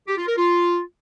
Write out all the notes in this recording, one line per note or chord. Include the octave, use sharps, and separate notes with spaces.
G4
F4
A#4
F4